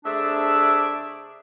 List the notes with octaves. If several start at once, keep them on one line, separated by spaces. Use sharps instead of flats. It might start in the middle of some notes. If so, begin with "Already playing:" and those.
C3 A3 D4 G#4 D5 E5